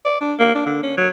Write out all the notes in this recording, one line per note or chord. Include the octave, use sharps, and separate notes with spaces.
D5
D4
A#3
D4
D3
C#4
F#3